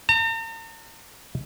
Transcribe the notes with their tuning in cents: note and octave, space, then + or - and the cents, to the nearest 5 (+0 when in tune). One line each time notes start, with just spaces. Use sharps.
A#5 -45